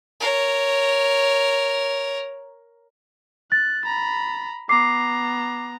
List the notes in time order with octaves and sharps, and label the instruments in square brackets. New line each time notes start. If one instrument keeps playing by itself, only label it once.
[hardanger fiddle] A#4 C#5
[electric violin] F#6 [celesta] A6
[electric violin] A#5 B5
[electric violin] B3 A#5 [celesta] D6 C7